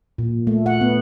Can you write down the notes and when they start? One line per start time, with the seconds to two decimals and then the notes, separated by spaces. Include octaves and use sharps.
0.18 A#2
0.47 A3
0.66 F#5
0.81 B3